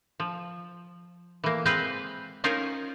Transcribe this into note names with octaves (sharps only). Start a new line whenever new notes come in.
F3
E3 A#3
G#3 C4 B4 C5 F5 G5
C#4 D#4 F4 A#4 C5 C#5